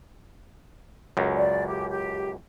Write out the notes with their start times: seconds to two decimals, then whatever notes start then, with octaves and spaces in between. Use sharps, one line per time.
1.17 C#2 F#2
1.35 D5
1.67 G4
1.89 G4